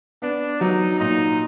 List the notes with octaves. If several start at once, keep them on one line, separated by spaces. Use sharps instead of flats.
B3 D4
F#3 D#4
A#2 D#4